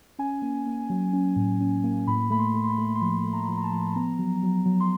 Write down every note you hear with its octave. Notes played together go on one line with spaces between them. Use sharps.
C#4 G#5
A#3
A#3
F#3
C#4
A2
C#4
A#3
A2 B5
A3 B5
C6
A3
C6
B5
A3
C6
F3 B5
A3
A#5
F3
A#5
A5
F3
B3 A#5
F#3
F#3
F#3
C6